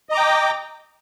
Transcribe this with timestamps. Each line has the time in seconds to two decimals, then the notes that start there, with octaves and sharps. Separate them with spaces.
0.09 D#5
0.12 A#5
0.15 D6
0.17 G5